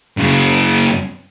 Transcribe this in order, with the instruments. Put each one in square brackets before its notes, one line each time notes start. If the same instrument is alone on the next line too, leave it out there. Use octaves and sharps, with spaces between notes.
[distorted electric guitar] F#2 C#3